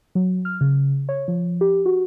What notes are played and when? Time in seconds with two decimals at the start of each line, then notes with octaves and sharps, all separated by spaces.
0.15 F#3
0.45 F6
0.61 C#3
1.09 C#5
1.28 F3
1.61 G4
1.86 F#4